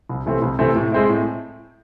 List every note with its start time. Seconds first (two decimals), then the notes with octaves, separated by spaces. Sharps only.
0.09 C2
0.26 C3 E3 A3 C4
0.42 C2
0.59 C3 E3 A3 C4
0.76 A2
0.92 G#3 C4 E4
1.09 A2